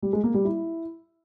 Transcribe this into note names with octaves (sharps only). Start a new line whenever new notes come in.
G3
G#3
A#3
G3
E4